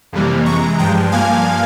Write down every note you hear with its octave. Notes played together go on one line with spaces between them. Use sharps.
F2 C3 E3 G3 A#3
C3 E3 G#3 A#5 C#6
G2 F3 G#3 G5 A#5
G2 F3 A#3 F5 G#5